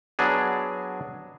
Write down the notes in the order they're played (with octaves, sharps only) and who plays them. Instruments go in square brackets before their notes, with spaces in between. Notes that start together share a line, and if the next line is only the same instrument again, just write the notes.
[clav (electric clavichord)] F#3 B3 D4 G#4